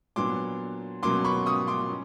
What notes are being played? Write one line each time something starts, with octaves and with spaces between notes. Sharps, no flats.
A#2 F#3 B3 D4 C6 D6
B2 F#3 A#3 C#4 C6 D6
B5 C#6
C#6 D#6
C6 D6
C#4